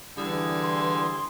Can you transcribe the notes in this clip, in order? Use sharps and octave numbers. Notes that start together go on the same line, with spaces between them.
D3 E3 G3 E4 G#4
C6